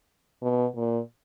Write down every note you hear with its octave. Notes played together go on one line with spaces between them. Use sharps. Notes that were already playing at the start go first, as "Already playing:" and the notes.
B2
A#2